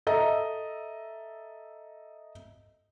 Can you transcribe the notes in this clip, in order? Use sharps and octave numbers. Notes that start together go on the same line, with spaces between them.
A4 D#5 E5 A#5